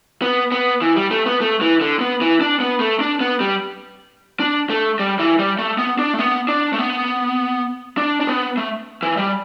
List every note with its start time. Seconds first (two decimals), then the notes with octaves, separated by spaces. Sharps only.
0.22 B3
0.52 B3
0.82 E3
0.96 G3
1.11 A3
1.26 B3
1.41 A3
1.61 E3
1.81 D3
2.00 B3
2.21 E3
2.41 D4
2.60 B3
2.80 A3
3.00 D4
3.20 B3
3.40 G3
4.40 D4
4.70 A3
4.99 G3
5.19 E3
5.39 G3
5.59 A3
5.78 B3
5.99 D4
6.14 A3
6.19 B3
6.48 D4
6.73 A3
6.79 B3
7.97 D4
8.21 D4
8.27 B3
8.57 A3
9.03 E3
9.17 G3